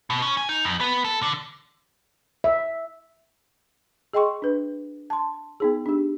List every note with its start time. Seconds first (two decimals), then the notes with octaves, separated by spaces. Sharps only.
0.10 B2
0.22 C#4
0.37 G#5
0.49 D#4
0.65 F2
0.80 B3
1.04 A4
1.23 D3
2.44 E5
4.13 G#4 D#5 G5 C6 C#6
4.42 D4 B4
5.10 A5 C6
5.60 B3 D#4 G#4
5.86 D4 G4